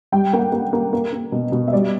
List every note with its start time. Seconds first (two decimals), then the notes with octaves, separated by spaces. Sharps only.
0.12 G3 G5
0.33 A#3 G5
0.39 F#5
0.52 A#3
0.73 A#3
0.93 A#3
1.13 A#3
1.32 B2
1.52 B2
1.68 E5
1.73 G3 D5